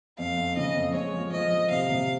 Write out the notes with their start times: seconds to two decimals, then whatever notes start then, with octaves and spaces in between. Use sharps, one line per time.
0.18 F2 F5
0.37 F2
0.57 C#3 D#5
0.76 F2
0.94 G#3 C#5
1.13 F3
1.32 F3 D#5
1.52 F3
1.70 C3 F5
1.90 C3